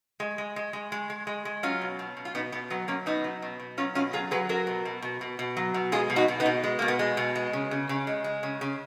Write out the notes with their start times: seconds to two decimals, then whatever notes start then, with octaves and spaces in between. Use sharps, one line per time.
0.20 G#3
0.38 G#3
0.56 G#3
0.73 G#3
0.92 G#3
1.10 G#3
1.27 G#3
1.45 G#3
1.63 F#3 C#4 F4
1.81 B2
1.99 B2
2.17 B2
2.25 F4
2.35 B2 B3 D#4
2.52 B2 B3
2.70 F#3 B3
2.88 F#3 A#3 C#4
3.06 B2 B3 D#4
3.24 F#3
3.42 B2
3.60 B2
3.78 F#3 C#4 F4
3.95 B2 C#4 F4
4.13 F#3 F4 G#4
4.31 F#3 G#4 B4
4.49 F#3 F#4 A#4
4.67 B2
4.85 B2
5.02 B2
5.21 B2
5.39 B2
5.57 F#3
5.74 B2
5.92 G#3 F4 G#4
6.10 B2
6.16 D#4 F#4
6.28 B2
6.40 B3 D#4
6.46 B2
6.64 G#3
6.79 B2 A#3
6.88 B3
6.99 G#3
7.17 B2
7.35 G#3
7.53 C#3
7.71 C#3
7.89 C#3
8.07 G#3
8.24 G#3
8.43 C#3
8.61 C#3